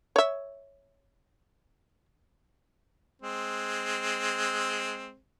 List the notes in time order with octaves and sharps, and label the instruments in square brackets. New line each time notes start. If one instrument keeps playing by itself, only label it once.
[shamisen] C#5 E5
[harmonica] G#3 C4